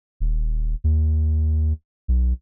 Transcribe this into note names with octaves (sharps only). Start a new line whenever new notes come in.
D#1
D#2
B1